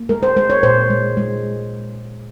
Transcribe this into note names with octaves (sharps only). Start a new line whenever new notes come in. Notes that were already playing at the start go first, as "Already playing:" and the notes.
Already playing: A#3
G#3 A#4
C5
G#3 C5
C#5
A#2 C5
G#3
G#3